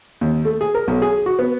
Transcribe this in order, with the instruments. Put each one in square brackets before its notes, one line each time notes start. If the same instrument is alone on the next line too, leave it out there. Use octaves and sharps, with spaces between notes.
[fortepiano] D#2
A3
G#4
A#4
B1
G#4
F#4
B3